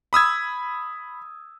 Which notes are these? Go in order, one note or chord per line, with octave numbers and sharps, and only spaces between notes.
B5 D#6 E6 G#6